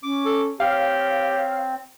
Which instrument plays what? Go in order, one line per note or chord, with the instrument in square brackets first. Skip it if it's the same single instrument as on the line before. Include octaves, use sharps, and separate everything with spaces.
[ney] C#4 [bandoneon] D6
[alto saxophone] A4
[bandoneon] C4 [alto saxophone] G4 [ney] C#5 [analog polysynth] F5